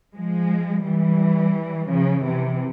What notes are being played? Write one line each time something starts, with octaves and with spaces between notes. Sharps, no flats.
F3 G#3
E3 G3
C#3 F3
C3 E3